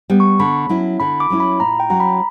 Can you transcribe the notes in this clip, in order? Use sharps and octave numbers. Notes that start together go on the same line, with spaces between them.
G3 B3
C#6
D3 B5
F#3 C#4 E4
D3 B5
D6
F#3 C#4 E4
B5
A#2 A#5
G5
F#3 C#4 F#4 A#5
B5